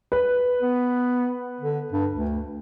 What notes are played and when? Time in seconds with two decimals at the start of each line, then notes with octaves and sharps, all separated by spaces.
0.12 B4
0.62 B3
1.60 D3
1.92 G2
2.13 D2